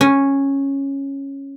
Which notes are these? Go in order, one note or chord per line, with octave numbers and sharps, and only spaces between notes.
C#4